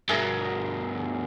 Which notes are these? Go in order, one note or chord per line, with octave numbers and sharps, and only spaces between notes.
G2 B2 G#4 A#4 E5